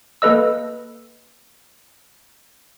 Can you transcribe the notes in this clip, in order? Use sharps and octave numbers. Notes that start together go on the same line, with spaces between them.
A#3 A4 B4 D#5 E6